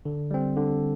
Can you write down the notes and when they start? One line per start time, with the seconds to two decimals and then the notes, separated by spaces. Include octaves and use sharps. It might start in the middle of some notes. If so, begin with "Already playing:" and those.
0.05 D3
0.31 G3 C4
0.56 D3